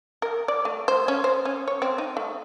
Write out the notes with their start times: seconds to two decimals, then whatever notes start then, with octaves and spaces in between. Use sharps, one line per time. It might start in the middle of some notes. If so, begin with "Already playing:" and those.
0.22 A#4
0.48 D5
0.65 A3
0.88 C5
1.08 C#4
1.24 C5
1.45 C#4
1.68 C#5
1.82 C4
1.98 D#4
2.17 A3